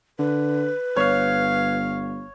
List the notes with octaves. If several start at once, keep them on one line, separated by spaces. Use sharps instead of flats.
D3 B4
G1 C#5 F5